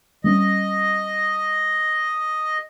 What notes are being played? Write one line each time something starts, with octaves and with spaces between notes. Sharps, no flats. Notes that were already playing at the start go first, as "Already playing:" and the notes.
G3 B3 C#4 D#5